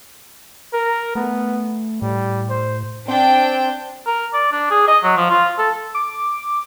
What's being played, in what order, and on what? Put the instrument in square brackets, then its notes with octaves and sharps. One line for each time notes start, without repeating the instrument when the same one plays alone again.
[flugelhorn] A#4
[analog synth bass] A3 [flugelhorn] B3
[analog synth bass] A2 [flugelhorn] G3
[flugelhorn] C5
[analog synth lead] C4 [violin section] D4 G5
[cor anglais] A#4
D5
D4
G#4
D#5
F#3
F3
F4
A4
[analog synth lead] D6